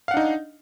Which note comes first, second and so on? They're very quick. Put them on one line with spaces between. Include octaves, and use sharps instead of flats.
F5 F#5 D4 D#4